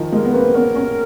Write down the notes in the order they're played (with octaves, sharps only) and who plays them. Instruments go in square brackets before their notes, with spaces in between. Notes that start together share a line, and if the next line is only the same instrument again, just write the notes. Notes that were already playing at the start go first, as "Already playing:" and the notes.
Already playing: [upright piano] D#3 F3
[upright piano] G#3 A#3 [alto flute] A#4
[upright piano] B3
[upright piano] A#3 C4 [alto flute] B4
[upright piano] B3 C#4 [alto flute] A#4
[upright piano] B3 C#4